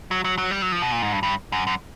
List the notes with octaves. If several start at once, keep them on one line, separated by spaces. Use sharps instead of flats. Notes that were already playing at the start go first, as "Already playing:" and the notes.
F#3
F#3
F#3
G3
F#3
F3
B2
A#2
G#2
G2
G2
F#2
F#2